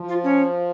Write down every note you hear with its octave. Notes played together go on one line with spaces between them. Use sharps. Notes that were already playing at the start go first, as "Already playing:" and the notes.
Already playing: F3
F4
C#4